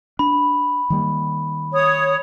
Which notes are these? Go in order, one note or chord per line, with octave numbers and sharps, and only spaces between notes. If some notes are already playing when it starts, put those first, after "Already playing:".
D4 B5
D#3 G3 A#3
C#5 D#6